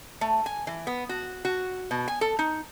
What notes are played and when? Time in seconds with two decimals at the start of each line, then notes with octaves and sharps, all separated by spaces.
0.21 A3
0.46 G#5
0.67 E3
0.87 B3
1.09 F#4
1.45 F#4
1.91 B2
2.08 G#5
2.21 A4
2.39 D#4